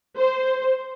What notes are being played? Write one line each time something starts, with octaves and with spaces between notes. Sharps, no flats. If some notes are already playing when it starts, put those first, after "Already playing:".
C5